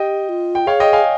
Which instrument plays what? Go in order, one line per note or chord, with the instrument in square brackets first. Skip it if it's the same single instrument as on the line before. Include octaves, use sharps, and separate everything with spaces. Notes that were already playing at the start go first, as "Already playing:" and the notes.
Already playing: [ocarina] G4 [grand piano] D#5 G5
[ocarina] F4
[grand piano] G5
[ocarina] G#4 [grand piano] C#5 F5
[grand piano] D#5 G5
F5 G#5